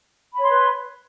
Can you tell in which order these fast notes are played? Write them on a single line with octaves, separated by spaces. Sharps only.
B5 C#5 C6 B4